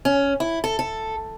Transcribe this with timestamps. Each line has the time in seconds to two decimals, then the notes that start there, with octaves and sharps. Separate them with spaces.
0.05 C#4
0.40 E4
0.64 A4
0.79 A4